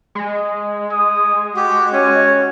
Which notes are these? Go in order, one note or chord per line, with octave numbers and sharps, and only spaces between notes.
G#3
D#6
F#4 G4
C#4 C#5